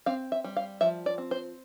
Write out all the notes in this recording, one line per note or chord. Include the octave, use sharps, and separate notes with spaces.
C4 F5
E5
G3
F5
F3 E5
D5
C4
C5